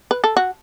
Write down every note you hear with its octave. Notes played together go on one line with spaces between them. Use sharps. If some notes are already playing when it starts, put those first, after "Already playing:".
B4
A4
F#4